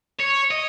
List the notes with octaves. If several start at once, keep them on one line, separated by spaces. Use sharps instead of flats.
C#5
D#5